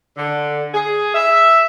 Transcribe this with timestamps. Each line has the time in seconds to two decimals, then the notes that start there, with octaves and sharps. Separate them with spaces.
0.17 D3
0.74 G#4
1.15 E5